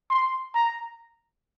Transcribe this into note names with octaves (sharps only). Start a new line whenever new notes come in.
C6
A#5